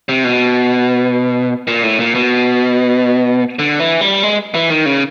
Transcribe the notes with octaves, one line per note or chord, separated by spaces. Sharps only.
C3
B2
A#2
A2
A#2
B2
D3
E3
G3
G#3
E3
D#3
C#3